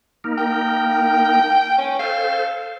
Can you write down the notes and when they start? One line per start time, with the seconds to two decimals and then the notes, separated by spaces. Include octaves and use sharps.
0.24 A#3 D#4 A#4
0.38 G5
1.78 C#4
1.99 A4 C5 F5